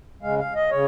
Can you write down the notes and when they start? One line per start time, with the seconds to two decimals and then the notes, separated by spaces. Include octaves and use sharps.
0.22 C#3 G#3 F5
0.39 F5
0.55 D#5
0.71 C#3 C#5